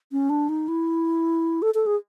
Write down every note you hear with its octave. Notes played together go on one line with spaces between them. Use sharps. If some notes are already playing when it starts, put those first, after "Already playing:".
C#4
D4
D#4
E4
A4
A4
G#4